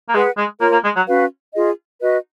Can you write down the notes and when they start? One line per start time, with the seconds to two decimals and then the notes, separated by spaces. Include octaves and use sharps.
0.09 A#3
0.14 G#3 G#4 B4 F#5
0.37 G#3
0.60 A#3 F4 A#4 C#5
0.72 A#3
0.84 G#3
0.96 F#3
1.08 C#4 F#4 B4 F5
1.54 F4 G#4 D#5
2.01 F#4 B4 D#5